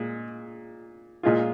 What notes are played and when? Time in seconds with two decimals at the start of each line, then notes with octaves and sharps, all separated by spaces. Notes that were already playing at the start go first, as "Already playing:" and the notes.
Already playing: A#2 G#3
1.23 A#2 G#3 F4